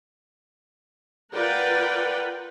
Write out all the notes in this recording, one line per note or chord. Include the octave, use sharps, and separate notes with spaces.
F4 A#4 B4 D5 F#5 G5